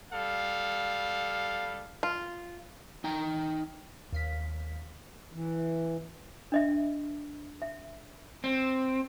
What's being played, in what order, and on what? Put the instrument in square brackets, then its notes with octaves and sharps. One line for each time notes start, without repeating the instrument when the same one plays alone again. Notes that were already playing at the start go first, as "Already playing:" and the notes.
[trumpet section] G3 A4 F5
[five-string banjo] F4
[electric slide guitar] D#4 G5 A#5
[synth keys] D#2 F5 B6
[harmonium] E3
[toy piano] D4 D#5 E5
E5
[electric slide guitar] C4